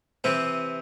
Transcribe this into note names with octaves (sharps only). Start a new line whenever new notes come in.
C3 E3 C4